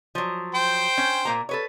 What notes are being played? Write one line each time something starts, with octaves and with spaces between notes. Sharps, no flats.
F3 F#3
C5 G5
C#4
A#2 A#3 A#5
A4 B4 C#5